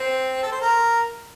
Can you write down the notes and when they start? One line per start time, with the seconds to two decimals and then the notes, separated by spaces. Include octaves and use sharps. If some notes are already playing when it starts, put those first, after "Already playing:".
Already playing: C4
0.43 A4
0.52 C5
0.61 A#4